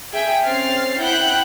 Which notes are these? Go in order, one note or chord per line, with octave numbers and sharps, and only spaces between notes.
G#4 E5 G5
C4 C#4 F6 A6 C7
E4 F#5 G5 F#6 G6